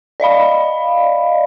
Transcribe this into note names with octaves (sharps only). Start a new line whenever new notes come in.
D5 D#5 F5 B5